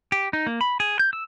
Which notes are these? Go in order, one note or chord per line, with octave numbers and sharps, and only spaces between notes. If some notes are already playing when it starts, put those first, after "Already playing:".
G4
D#4
A#3
B5
G#4
G6
E6